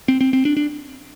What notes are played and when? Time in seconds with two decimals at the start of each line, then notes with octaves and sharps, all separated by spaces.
0.08 C4
0.21 C4
0.33 C4
0.45 D4
0.57 D4